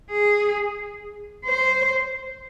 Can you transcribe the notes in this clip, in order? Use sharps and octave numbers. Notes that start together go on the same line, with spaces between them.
G#4
C5